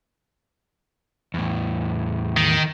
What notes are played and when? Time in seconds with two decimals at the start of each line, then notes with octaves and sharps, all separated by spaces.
1.34 E2 A2
2.37 D#3